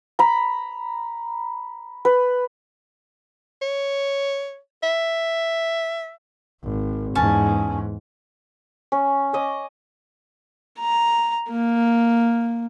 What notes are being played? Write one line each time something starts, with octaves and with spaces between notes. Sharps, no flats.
A#5 B5
B4
C#5
E5
G#1
E2 G#2 C#4 C#5 A5
C#4
C#5 D#5 D6
A#5
A#3